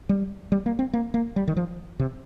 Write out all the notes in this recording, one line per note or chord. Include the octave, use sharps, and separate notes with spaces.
G3
G3
A#3
C4
A#3
A#3
G3
D#3
F3
C3